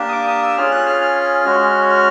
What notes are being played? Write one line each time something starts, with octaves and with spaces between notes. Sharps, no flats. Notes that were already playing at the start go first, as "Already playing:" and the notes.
Already playing: A#3 D4 G4
D#6
D6
D#6
E6
C#4 F4 G#4 F6
F#6
F6
F6
G#3 C#4 F#4
F6